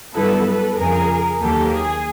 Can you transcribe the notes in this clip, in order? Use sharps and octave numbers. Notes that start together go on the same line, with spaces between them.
G2 D3 F#3 B3 E4 A4 B4
A4 B4
F2 C#3 F3 G#4 A#4
D#2 D#3 F#3 A#3 G4 A4
G#4